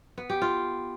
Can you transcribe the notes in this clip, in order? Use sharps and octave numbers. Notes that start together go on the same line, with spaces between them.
B3
G4
F4